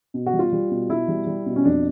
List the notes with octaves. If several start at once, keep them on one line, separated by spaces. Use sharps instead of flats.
B2
F#4
G3
F4
G3
B2
B2 E4
G3
G3
B2
C#4
F2 D4